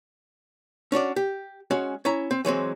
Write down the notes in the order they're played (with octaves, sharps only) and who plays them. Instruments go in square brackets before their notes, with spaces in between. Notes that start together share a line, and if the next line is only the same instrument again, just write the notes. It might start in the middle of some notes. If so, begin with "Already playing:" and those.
[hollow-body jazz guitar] C#4 D4 F#4 D5
G4
G#3 C#4 F#4
C#4 E4 A#5
C4
E3 F#3 G#3 C4